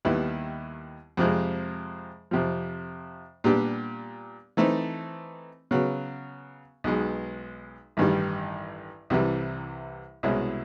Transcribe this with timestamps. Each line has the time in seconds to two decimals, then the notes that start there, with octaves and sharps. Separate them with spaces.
0.05 D#2 D#3 G3 B3 E4
1.17 F2 C3 F3 G#3
2.31 F2 C3 F3
3.44 A#2 G3 B3 D4 G4
4.57 E3 A3 C4 D#4
5.71 C#3 F#3 B3
6.84 B1 B2 G#3
7.97 A1 G2 D#3 G3
9.10 C2 C3 E3 G3
10.23 C2 B2 G#3 C#4 E4